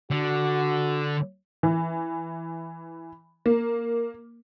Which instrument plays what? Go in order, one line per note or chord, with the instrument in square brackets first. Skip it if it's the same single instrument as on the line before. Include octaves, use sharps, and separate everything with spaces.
[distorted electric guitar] D3 [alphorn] F#4
[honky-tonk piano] E3
A#3